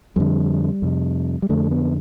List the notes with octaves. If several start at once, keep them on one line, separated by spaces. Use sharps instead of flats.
F2 D3 G3
F2 C3
G3
F2 D3 A3
B3